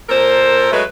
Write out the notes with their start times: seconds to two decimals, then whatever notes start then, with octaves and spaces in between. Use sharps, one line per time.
0.09 A#2 A4 A#4 C5
0.72 F#3 G#3 A3 B4